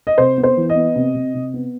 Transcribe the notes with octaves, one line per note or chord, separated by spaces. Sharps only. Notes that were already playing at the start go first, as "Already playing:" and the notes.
D#5
C3 C5
B3
C5
E3
D#5
B3
C3
C3
C3
B3